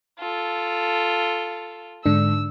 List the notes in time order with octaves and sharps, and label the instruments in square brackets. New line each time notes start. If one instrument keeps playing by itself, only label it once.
[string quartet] F4 A4
[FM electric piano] G#2 D3 D4 [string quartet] E6